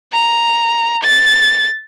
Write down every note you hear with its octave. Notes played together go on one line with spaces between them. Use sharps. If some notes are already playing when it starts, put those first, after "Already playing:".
A#5
A6